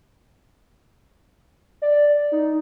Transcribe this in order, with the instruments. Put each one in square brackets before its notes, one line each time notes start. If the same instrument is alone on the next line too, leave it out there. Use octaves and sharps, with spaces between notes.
[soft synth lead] D5
D#4